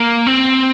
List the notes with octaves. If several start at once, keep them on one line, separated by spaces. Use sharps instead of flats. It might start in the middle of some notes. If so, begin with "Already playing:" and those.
Already playing: A#3
C4